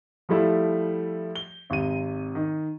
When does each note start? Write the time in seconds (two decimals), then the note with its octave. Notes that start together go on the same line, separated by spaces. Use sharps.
0.29 F3 G3 A3 E4
1.36 G7
1.70 G#1 C3 D#7
2.35 D#3